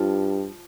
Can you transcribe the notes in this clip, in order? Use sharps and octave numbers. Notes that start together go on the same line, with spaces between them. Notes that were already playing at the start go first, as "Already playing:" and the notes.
Already playing: G2 F3